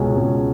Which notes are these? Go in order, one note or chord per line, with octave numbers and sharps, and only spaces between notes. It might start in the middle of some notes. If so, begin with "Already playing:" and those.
Already playing: C#2 B2 C#4
C#2